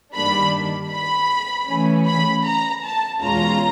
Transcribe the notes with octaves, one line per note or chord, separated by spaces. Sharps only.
G2 D#3 G3 A#3 D4 B5
B5
C#3 E3 A3 C#4
B5
A#5
A5
E2 B2 G#3 C#4 F4 A#5